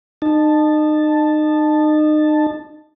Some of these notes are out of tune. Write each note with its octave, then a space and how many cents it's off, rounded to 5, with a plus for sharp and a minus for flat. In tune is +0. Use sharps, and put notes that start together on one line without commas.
D#4 -30 A5 +0